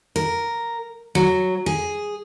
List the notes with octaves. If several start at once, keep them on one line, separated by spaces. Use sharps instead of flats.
A#4
F#3
G#4